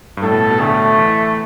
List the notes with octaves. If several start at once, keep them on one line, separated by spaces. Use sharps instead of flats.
G2
A2 A4
B2
B2
D3 A3
E3